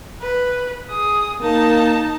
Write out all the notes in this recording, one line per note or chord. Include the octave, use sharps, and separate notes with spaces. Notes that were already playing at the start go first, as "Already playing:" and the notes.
B4
G#4 D#6
A#3 D#4 A5